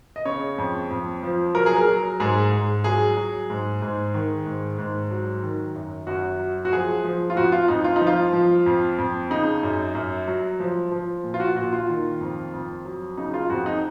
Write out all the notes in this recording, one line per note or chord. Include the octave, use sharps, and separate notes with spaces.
D#5
C#3 C#5
F2
F2
F3
F#3 A#4
G#4
A#4
F#3
G#2 G#4
G#2
F#3 G#4
F#3
G#2
G#2
D#3
G#2
G#2
F#3
D#3
F#2
F#2 F#4
F#3
F#4
F3 G#4
F3
F4
F2 F#4
F4
F2 D#4
F4
D#4
F3
F4
F3
F2
F2
C#3 D#4
F#2
F#2
F#3
F3
F3
A#2
F4
F#4
A#2 F#4
F4
D#3
F2
F2
F#3
C#3 D#4
F4
F2 F#4
D#4